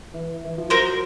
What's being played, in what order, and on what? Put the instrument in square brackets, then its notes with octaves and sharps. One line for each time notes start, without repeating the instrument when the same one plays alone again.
[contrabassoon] E3
E3
F3
[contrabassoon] F#3 [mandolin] A#4 C5